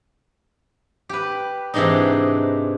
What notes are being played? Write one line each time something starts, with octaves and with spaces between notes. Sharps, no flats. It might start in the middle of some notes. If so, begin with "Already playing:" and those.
G4 B4
G#2 C3 E3 G#3 D4 D#4